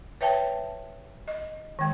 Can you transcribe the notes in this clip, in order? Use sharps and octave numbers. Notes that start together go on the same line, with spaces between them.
B4 C#5 E5 G5 A5
D#5
D#3 G#3